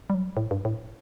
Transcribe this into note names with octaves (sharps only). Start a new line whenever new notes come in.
G3
F#3
A2
G2
A2